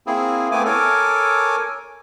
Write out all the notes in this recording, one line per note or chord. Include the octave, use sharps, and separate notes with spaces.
A#3 C4 E4 G#4
A3 B3 C4 E4 G#5 D6
A4 A#4 C#5 G#5 D6